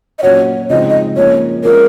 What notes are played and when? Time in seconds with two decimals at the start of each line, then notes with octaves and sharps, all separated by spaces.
0.19 D#5
0.23 A#2 F#3 C#4 F#4 C#5
0.70 C#3 F3 G#3 C4 D#4 D#5
0.90 D#5
1.17 F3 A#3 C#4 C#5
1.64 F3 G#3 C#4 A#4